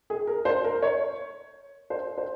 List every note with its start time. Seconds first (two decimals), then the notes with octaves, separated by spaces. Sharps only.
0.10 G#4
0.27 A#4
0.45 C5
0.64 A#4
0.82 C#5
1.90 C5
2.18 C5